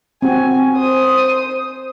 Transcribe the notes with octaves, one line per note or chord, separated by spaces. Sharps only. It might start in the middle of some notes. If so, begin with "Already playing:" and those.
C4 F#4 G#5
C5 D#6